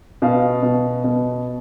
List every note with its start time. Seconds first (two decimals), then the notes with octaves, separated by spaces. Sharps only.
0.22 B2 F5
0.62 B2
1.04 B2